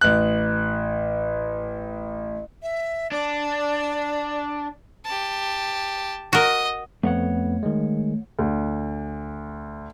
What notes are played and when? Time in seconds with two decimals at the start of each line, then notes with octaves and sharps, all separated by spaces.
0.01 A1 F#6
2.63 E5
3.12 D4 D5
5.05 G4 A5
6.33 F#4 A#4 D#5
7.03 F2 A3 B3 C#5 F#5
7.63 D#3 G#3
8.39 D2